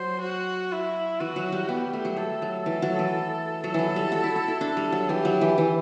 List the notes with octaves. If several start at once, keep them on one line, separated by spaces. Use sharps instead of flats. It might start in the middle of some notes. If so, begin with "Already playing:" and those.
Already playing: F#3 C5
F#4
E4
E3 F#4
F#3
G3
B3 G4
A3
F#3
G3 A4
F#3
E3 A4
F#3
E3
F#3 A4
E3 F#3
G3
F#4
E4
F#4
E4
D4 A4
G3
F#3
E3 G4
F#3
E3
E3